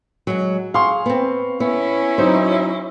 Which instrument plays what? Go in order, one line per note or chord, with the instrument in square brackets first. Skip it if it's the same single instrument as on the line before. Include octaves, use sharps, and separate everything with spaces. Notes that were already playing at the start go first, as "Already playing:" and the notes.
[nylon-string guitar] F#3 G#3
[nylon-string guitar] G#4 [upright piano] F5 C6 C#6
[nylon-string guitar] B3 C4
[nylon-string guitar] B3 [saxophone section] C#4 E4
[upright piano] F#3 D#4 [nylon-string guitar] C5